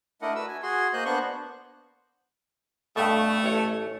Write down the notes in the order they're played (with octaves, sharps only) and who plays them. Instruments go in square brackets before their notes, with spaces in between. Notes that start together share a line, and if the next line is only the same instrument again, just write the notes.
[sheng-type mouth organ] A3 D4 E4 A#4 D#5 F#5
F#4 B4 E6
G#5
F#4 G#4 C6
A#3 C5 D#5 F#6 G6
B3 D4 C5 C#6 F#6
[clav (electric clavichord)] G2 B2 [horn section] A3
[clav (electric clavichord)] A1 C#5